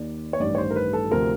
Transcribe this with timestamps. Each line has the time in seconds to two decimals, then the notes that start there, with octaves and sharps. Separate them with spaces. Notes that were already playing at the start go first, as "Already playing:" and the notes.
Already playing: D#2 D#3 D5
0.33 C#5
0.40 A1 G2 D#3 D5
0.55 C#5
0.58 C5
0.71 A#4
0.76 B4
0.93 A4
1.11 D2 C3 F3 A#4